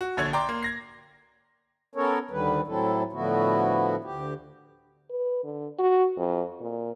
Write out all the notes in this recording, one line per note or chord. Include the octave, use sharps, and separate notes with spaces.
F#4
A#1 D3 C#5 G#6
D4 G5 A#5 C6 D6
A#3 C6
G#6 A#6 C7
B3 C#4 A4 A#4 C#5
D2 D3 D#3 G3 B4
A2 F#3 C4 E4 A4
A2 D3 F3 B3 E4 F#4
D2 G4
B4
D3
F#4
F2
A#2